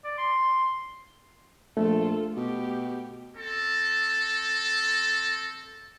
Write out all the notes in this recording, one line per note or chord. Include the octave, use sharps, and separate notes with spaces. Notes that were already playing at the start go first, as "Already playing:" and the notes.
D5
C6
A#1 A3 F4 A4
B2 G4
C4 A4